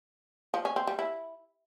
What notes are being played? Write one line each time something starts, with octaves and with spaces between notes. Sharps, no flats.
F3
C#4
C4
G3
E4